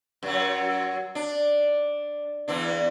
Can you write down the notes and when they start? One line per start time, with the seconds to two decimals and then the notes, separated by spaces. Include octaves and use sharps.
0.23 F#2 F#3
1.15 D4
2.48 E2 E3 D4